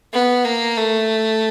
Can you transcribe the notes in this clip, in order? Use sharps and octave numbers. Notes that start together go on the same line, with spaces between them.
B3
A#3
A3